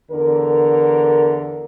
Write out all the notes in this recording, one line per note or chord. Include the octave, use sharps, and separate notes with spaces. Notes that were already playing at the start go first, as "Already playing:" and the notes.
E2 D3 A#4